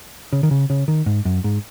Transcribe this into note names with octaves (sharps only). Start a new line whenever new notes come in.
C#3
D#3
C#3
C#3
D#3
G#2
F#2
G#2